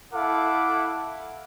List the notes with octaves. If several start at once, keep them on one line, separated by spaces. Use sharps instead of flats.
E4 A4 F5 F#5 D6